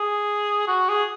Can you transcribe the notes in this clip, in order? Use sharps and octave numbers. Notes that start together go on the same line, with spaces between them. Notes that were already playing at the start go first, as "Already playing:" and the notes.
Already playing: G#4
F#4
G#4